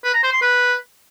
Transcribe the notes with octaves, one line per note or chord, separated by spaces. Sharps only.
B4
A#5
C5
C6
B4